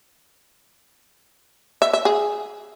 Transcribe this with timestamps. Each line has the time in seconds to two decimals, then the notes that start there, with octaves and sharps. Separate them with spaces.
1.82 E5
1.93 E5
2.05 G#4